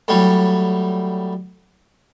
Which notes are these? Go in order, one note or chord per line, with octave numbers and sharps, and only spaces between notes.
A2 F#3 G3